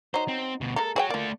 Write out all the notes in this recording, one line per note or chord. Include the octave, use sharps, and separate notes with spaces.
F#3 D#4 C5
C4
D2 B2
G#3 A#3 A4 A#4
F#4 G#4 C#5 D5 G5
A3 A#3 F4 D5